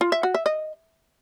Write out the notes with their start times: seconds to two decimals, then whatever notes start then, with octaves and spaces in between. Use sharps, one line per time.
0.01 F4
0.12 E5
0.23 F#4
0.35 E5
0.46 D#5